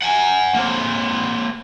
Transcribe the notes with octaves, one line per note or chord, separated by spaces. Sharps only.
F#5 G#5
A#3 C4